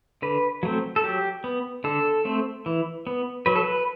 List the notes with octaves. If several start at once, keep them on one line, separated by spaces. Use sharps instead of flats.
D3 B4
F#3 A3 C4
A4
F#3 G4
B3
D3 A4
A3 C4
E3
B3
F#3 B4
A4
B4